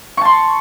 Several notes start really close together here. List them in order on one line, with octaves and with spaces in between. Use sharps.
C#6 A5 C6